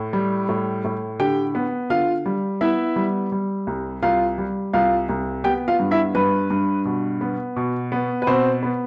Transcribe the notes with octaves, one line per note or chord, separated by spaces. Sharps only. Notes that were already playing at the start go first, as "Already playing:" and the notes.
Already playing: A2
G3
A2
A2
D3 G4 G5
B3
D3 F4 F5
G3
B3 E4 E5
G3
G3
C2
C2 F4 F5
G3
C2 F4 F5
C2
B3 G4 G5
F4 F5
G2
E4 E5
G2 B4
G2
B2
B3
B2
B3
B4
B2 C4 C5
B3